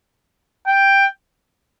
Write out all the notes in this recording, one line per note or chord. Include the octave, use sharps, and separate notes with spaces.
G5